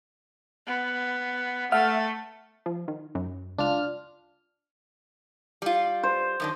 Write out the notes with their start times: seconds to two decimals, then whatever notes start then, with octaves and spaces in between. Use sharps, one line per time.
0.67 B3
1.72 A3 E5 F#5 F6
2.66 F3
2.88 D#3
3.15 F#2
3.58 C#2 D4 F4 F6
5.62 G3 F4
6.03 C5
6.40 F#2 D#3 D4